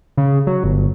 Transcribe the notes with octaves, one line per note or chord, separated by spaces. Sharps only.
C#3
F#3
G1